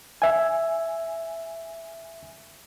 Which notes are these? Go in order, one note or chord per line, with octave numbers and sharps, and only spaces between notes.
E5 G#5